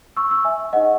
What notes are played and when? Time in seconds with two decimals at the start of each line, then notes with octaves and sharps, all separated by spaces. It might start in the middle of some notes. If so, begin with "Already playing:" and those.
0.17 C#6 E6
0.31 C#6 E6
0.44 E5 G#5
0.73 D#4 G#4 C5 D#5 F#5